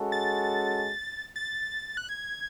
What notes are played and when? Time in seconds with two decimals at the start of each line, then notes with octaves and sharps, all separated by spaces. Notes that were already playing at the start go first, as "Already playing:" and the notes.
Already playing: G#3 C#4 F#4 A4
0.12 A6
1.36 A6
1.97 F#6
2.09 G#6